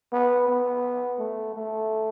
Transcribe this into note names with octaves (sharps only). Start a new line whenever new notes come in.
B3
B3
A3
A3